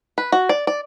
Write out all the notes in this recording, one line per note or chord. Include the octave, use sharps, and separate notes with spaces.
B4
F#4
D5
D5